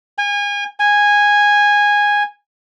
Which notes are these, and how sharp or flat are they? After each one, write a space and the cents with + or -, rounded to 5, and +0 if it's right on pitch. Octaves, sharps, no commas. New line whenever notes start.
G#5 -30
G#5 -10